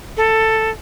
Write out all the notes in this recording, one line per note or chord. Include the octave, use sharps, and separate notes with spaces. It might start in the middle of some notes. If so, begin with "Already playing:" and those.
A4